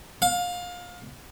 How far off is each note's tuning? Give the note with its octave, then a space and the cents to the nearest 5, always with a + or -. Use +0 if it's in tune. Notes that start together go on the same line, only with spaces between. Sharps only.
F5 +25